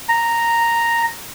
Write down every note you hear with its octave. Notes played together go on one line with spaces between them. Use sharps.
A#5